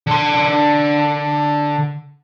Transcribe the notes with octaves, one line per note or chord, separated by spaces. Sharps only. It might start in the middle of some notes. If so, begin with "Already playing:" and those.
D3 C6